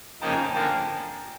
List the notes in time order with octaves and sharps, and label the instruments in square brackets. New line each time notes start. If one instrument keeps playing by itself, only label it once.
[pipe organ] F2 C#3 F3 A#3 D#4 [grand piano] G5 A5
[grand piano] G#5 A#5
G5 A5
[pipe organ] D3 F3 A#3 [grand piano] G5 A5